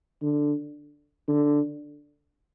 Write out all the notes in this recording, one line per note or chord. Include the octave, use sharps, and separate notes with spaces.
D3
D3